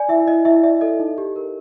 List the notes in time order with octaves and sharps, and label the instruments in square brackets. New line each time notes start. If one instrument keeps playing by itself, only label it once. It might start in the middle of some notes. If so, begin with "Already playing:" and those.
Already playing: [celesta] D5 G#5
E4 E5
E4 D#5
E4 E5
D5 E5
A4 D#5
D#4
G4
A#4